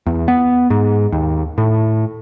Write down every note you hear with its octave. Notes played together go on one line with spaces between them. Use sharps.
E2
B3
G#2
D#2
A2